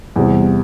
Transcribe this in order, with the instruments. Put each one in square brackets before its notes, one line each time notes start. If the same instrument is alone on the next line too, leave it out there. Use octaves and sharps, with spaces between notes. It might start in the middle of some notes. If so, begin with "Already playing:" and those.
[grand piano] E2 C3 G3